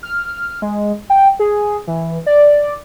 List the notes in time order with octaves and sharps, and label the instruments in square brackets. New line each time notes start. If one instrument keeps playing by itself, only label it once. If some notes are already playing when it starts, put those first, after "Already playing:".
[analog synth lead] F6
G#3
G5
G#4
E3
D5